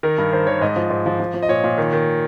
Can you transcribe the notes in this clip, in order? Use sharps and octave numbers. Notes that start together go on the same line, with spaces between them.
D#3 A#4
G2
D#3 C5
D#3 C#5
G#2 D#5
F3
G#2
F3
F3
F3
D#5
A#2 C#5
A#2
D#3
D#3